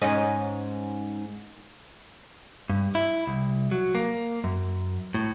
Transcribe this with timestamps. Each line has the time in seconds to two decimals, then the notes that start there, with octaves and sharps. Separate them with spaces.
0.02 G#2 C#4 D#4
2.70 G2
2.95 E4
3.27 C2
3.72 F#3
3.95 A#3
4.44 F#2
5.15 A2